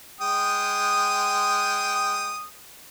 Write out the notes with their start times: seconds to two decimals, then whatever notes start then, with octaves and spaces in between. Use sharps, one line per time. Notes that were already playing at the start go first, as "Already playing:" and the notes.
0.21 G#3 G5 D#6